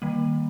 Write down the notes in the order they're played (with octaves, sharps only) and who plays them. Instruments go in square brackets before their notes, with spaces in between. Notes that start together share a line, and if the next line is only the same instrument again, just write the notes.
[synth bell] D#3 G3 A#3